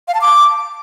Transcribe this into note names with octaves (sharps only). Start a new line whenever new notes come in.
F5
A5
D6